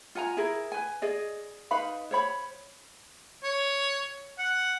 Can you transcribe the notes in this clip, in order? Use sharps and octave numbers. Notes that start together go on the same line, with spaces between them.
F4 F#5 G#5 A#5
E4 G#4 A#4
B4 G#5
G#4 D5 D#5
D#4 B4 F5 B5
C5 C#5 B5
C#5
F#5